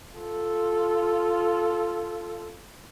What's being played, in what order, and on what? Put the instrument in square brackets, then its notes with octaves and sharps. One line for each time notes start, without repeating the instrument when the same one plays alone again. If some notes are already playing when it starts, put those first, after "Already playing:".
[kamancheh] F4 A4